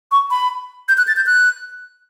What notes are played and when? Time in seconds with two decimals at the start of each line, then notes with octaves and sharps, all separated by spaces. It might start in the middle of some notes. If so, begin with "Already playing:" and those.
0.11 C#6
0.31 B5
0.89 G6
0.98 F#6
1.08 A6
1.16 G6
1.26 F#6